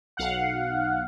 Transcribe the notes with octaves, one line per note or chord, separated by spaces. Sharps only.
B1 F5 F#5